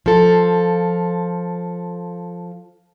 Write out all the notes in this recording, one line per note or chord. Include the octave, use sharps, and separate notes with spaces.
F3 A4